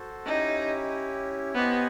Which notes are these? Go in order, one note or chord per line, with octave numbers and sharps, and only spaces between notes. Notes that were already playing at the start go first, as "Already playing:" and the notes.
Already playing: F#4 A4 C5
C#4 D#4 E4 G4
B3 G4 C5 D#5 G#5